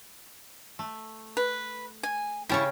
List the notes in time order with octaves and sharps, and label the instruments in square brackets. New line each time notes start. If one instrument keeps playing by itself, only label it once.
[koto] A3
[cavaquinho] B4
G#5
[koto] C#3 C#4 G4 [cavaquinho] E4 A5 C#6